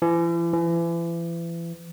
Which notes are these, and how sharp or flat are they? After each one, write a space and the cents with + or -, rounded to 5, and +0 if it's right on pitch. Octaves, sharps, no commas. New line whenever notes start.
E3 +40
E3 +35